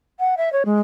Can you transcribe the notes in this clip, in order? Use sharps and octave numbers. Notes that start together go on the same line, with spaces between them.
F#5
E5
C#5
G#3